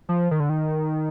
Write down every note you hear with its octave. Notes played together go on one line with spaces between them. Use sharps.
F3
D#3
D3
D#3